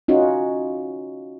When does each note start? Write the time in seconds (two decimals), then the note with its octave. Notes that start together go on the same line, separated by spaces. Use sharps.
0.08 C#4 D#4 F4 F#4